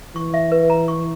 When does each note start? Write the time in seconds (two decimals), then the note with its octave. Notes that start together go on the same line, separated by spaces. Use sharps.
0.15 E3 C#6
0.34 E5
0.52 B4
0.70 A#5
0.88 C#6